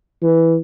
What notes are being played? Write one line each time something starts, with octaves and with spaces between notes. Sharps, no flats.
E3